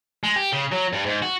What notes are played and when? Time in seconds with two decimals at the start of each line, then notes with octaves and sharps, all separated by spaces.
0.24 G#3
0.36 G4
0.53 C#3
0.72 F#3
0.93 G2
1.06 G#2
1.22 F#4